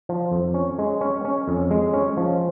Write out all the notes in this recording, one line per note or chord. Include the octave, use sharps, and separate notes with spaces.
F3
F2
C#4
G#3
C#4
C#4
F2
G#3
C#4
F3